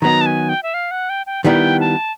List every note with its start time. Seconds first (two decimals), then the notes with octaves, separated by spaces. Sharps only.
0.02 D#3 F#3 B3 D#4 A#5
0.21 A5
0.26 G#5
0.49 G5
0.63 E5
0.74 F5
0.91 F#5
1.10 G5
1.26 G5
1.45 D#3 G3 B3 E4 G5
1.80 A5